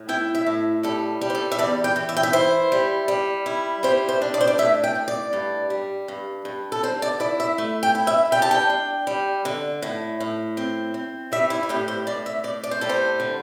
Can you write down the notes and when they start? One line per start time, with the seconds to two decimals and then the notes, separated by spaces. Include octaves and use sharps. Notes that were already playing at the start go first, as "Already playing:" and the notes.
Already playing: A2
0.09 E4 G5
0.35 E5
0.46 A2
0.83 G3 A4
1.21 G3
1.30 C5
1.35 A4
1.52 E5
1.58 E2 D5
1.84 G5
1.96 E3
2.09 E5
2.17 G5
2.23 E5
2.33 E4 C5
2.72 G3
3.08 G3
3.46 E4
3.83 G3 C5
4.09 C5
4.22 D4
4.34 D5
4.41 C5
4.47 D5
4.58 A2 E5
4.84 G5
4.95 A2
5.08 D5
5.33 G2
5.70 G3
6.08 G2
6.45 G2
6.72 A4
6.83 D3 C5
7.02 D5
7.20 E4 D5
7.40 E5
7.58 A3
7.83 G5
7.95 E4
8.07 E5
8.32 G3 G5
8.42 A5
8.51 G5
8.70 D4
9.07 G3
9.45 D3
9.82 A2
10.20 A2
10.57 C4
10.94 C4
11.32 G3 E5
11.50 E4
11.63 E4
11.69 A2 G4
11.88 C5
12.07 A2 D5
12.26 E5
12.44 A2 D5
12.63 D5
12.71 C5
12.81 G3 A4
12.89 C5
13.20 D3